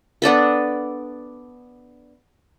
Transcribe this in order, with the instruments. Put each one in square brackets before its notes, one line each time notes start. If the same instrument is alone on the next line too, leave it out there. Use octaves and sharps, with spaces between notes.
[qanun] B3 D4 A4 B4